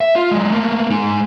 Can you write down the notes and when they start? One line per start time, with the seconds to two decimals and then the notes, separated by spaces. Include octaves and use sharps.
0.01 E5
0.16 F4
0.31 F#3 G#3
0.52 A3 A#3
0.90 G#3 D#4